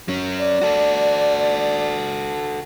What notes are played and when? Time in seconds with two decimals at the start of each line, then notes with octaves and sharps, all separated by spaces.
0.08 F#3 C#4
0.39 D5
0.61 F#4 A4